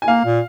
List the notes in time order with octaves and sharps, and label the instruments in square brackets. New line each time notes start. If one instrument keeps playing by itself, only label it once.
[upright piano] G#5
[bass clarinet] A#3 [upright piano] F5
[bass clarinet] A#2